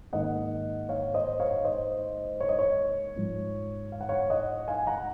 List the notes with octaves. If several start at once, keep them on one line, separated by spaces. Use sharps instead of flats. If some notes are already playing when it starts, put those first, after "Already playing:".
G#2 D#3 A#3 D#5 F#5
C#5 F5
C5 D#5
C#5 F5
C5 D#5
C#5
D#5
C#5
G#2 F3 G#3
F5
F#5
C#5 F5
D#5 F#5
F5 G#5
F#5 A#5